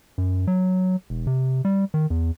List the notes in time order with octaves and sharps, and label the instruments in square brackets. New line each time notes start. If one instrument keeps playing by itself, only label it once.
[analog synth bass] F#2
F#3
E1
C3
G3
D#3
E2